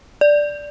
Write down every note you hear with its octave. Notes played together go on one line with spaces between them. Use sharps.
D5